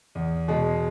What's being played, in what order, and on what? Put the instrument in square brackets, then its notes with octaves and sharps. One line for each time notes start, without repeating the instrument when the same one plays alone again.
[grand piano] E2
B2 G#3